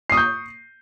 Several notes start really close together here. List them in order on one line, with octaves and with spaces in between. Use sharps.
C7 D#6 C#6 G6